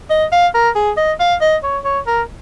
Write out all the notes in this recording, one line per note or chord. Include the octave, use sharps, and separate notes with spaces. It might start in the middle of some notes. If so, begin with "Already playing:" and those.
D#5
F5
A#4
G#4
D#5
F5
D#5
C#5
C#5
A#4